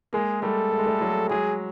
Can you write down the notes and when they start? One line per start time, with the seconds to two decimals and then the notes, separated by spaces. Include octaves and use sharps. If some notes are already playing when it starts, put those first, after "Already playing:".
0.13 G#3 A#3 G#4
0.42 G3 A3 A4
0.72 A3
0.78 G#3
0.86 G3 A3
1.00 F#3 G#3
1.30 F#3 G#3 G#4